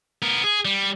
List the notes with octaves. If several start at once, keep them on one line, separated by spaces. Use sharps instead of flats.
B3 A#4
G#4
G3